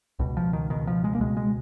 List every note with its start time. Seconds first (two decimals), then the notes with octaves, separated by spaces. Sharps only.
0.19 C#2 B2
0.37 F3
0.53 D#3
0.70 C#2 B2 D#3
0.87 F3
1.04 G#3
1.15 A#3
1.20 C#2 B2 G#3
1.37 G#3